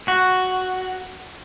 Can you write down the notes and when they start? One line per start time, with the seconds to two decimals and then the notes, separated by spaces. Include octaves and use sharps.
0.08 F#4